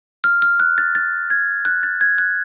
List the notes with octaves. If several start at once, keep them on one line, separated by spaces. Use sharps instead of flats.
F6
F6
F#6
A6
A6
G#6
F#6
A6
G#6
F#6